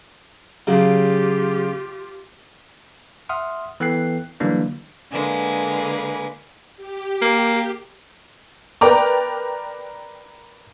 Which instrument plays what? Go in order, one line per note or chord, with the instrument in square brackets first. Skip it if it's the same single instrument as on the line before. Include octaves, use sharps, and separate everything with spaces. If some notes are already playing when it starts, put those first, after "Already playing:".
[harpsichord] C#3 F#3 [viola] F4 G4
[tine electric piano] E5 F#5 C6 D#6 F6
E3 B3 A4 G5 F#6 C7
D3 E3 F#3 G3 A#3 D4
[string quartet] D3 A#3 B4 [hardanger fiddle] G#3 G#5
[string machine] G4
[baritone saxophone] A#3
[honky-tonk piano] A#4 B4 D5 G5 A#5 D6